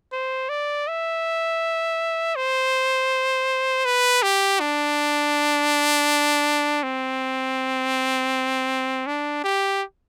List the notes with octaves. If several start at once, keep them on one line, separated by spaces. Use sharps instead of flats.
C5
D5
E5
C5
B4
G4
D4
C4
D4
G4